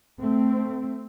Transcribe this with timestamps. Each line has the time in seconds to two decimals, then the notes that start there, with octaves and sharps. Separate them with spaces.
0.20 A3 C4